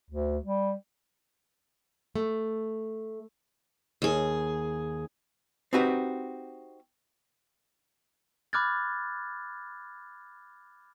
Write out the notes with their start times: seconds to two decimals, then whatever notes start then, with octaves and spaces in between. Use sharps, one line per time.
0.10 D2
0.43 G3
2.15 A3
4.02 D#2 G#4
5.73 C4 D#4 F#4 G4 B4
8.53 B5 D6 F6 F#6 G#6 A6